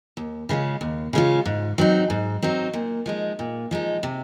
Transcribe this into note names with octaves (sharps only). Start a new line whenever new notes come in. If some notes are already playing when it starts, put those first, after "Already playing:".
D#2
C#3 G#3 C#4 F4
D#2
C#3 G#3 C#4 F4
G#2
F#3 C4 D#4
G#2
F#3 C4 D#4
A#2
F3 G#3 D#4
A#2
F3 G#3 D#4
C3